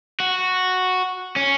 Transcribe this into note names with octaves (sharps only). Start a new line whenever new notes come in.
F#4
C#4